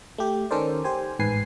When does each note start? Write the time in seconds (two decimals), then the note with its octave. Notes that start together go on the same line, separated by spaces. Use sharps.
0.18 A3 G4
0.51 D#3 C#4 A4 A#4 C5 D5
0.84 G4 C5 G#5
1.19 A1 G#2 B4 G#5 C7